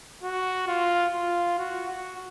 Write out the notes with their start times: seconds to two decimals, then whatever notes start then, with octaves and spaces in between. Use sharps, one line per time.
0.23 F#4
0.68 F4
1.13 F4
1.58 F#4
1.87 F#4